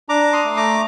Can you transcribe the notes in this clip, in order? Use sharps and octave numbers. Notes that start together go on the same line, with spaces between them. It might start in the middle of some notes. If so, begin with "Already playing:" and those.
D4 A#5 D6
C6 D#6
A3
A#5 D6